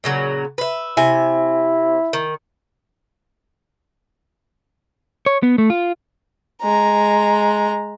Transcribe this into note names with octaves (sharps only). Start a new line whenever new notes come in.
A#2 C#3 F#3
B4 E5
C3 E4 G#5
D#3
C#5
B3
A3
F4
G#3 A#5